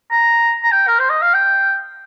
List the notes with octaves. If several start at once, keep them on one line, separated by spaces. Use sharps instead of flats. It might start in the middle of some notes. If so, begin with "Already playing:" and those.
A#5
A#5
G5
A#4
C5
D#5
F5
G5